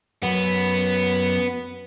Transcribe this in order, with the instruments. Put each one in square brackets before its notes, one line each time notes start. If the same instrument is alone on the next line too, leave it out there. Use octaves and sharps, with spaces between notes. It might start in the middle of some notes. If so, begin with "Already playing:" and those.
[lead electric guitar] F#2 F#3 [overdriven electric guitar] B3